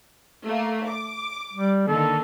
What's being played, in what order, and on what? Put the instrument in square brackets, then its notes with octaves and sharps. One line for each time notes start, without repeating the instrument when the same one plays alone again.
[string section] A3 A#3
D6
[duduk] G3
[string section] D3 D#3 A#3 [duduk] A4